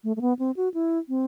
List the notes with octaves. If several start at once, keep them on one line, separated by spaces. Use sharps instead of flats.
A3
A3
B3
C4
F#4
E4
C4